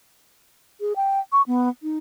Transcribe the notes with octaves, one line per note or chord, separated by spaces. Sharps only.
G#4
G5
C#6
B3
D#4